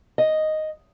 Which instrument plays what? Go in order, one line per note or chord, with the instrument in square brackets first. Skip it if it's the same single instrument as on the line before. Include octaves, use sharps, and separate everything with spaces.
[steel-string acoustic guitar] D#5